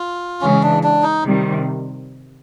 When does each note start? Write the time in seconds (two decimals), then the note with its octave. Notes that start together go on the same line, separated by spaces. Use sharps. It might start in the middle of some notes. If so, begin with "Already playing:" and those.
Already playing: F4
0.41 C#3 E3 G#3 C#4
0.63 D4
0.83 D4
1.02 D#4
1.24 C3 D#3 G3